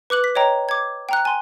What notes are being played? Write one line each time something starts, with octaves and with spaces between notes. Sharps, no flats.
B4 D6 F#6 F#7
B6
C#5 D#5 G5 A#5
D6 G#6
G5 A#5 F#6
G#5 C6